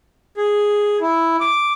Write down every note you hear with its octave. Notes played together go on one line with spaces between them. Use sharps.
G#4
E4
D6